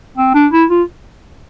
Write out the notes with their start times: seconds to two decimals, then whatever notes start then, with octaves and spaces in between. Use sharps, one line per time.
0.17 C4
0.35 D4
0.52 E4
0.70 F4